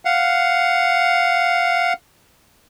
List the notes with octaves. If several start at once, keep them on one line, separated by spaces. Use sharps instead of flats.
F5 F#5